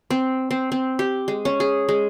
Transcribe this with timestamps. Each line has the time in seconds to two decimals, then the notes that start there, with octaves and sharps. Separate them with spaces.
0.11 C4
0.51 C4
0.72 C4
0.99 G4
1.28 G#3
1.45 C#4
1.60 G#4
1.89 G#3